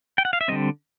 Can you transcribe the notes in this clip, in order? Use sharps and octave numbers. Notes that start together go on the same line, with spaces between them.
G5
F#5
F5
E5
D3 G3 C4 D#5